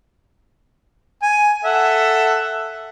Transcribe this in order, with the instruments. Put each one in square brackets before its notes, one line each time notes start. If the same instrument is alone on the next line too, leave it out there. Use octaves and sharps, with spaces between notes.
[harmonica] G#5
A4 E5 F#5